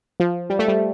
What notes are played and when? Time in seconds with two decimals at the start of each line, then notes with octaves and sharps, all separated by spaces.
0.20 F3
0.50 G3
0.59 A3
0.68 G3